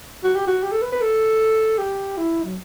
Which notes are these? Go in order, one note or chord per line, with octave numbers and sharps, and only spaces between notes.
F#4
G4
F#4
G4
A4
B4
B4
A4
G4
E4
F#3